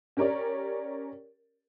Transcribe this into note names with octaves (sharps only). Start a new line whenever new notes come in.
C#4 G4 A#4 C#5 D5